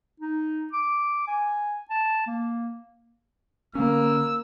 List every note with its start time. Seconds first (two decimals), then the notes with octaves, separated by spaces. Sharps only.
0.20 D#4
0.73 D6
1.28 G#5
1.90 A5
2.27 A#3
3.75 D3 A#3 C#4 E6